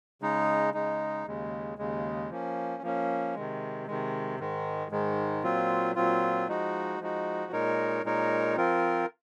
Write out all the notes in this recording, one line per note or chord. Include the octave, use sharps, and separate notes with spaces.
C#3 G#3 D#4
C#3 G#3 D#4
D#2 C#3 G#3
D#2 C#3 G#3
F3 A#3 C#4
F3 A#3 C#4
C3 D#3 G#3
C3 D#3 G#3
G#2 D#3 G#3
G#2 D#3 G#3
A#2 F#3 C4 F4
A#2 F#3 C4 F4
F3 G#3 D#4 F#4
F3 G#3 D#4 F#4
A#2 G#3 D#4 A#4 C#5
A#2 G#3 D#4 A#4 C#5
F3 C4 F4 A#4